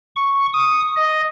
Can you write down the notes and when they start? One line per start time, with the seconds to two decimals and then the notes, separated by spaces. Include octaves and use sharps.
0.16 C#6
0.54 D#6
0.96 D#5